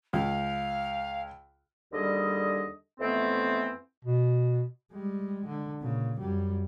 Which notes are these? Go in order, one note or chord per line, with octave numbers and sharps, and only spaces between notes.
C#2 F5
D#2 D3 G3 G#4 D#5
F2 E3 A3 B3 C4
B2
G3 G#3
D3
A#2 C#3
F#2 G3